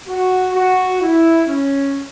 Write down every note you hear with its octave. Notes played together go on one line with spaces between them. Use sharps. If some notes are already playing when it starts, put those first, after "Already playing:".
F#4
F#4
E4
C#4